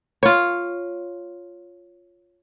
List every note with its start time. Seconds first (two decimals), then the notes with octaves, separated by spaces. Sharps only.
0.23 F4 C#5